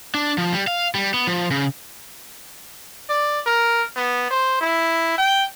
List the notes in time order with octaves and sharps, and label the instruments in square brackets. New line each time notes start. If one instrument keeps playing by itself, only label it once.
[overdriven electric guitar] D4
F3
G3
F5
G3
B3
F3
C#3
[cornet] D5
A#4
B3
C5
E4
G5